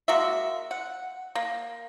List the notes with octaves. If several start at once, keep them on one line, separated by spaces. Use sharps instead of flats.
G#3 A#3 F#4 E5
F#5
A#3